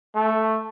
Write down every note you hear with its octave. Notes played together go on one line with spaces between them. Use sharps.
A3